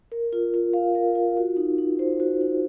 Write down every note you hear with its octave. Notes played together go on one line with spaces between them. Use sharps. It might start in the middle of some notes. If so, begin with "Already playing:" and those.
A#4
F4
F4
F5
A#4
F4
F#4
D#4
D#4
C5
F#4
D#4